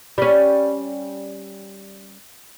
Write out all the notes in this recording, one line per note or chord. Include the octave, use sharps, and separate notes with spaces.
G3 C#4